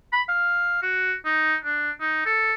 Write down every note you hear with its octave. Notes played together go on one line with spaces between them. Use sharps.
B5
F5
F#4
D#4
D4
D#4
A4